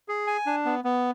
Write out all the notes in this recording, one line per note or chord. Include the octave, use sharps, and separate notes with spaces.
G#4
G#5
D4
B3
B3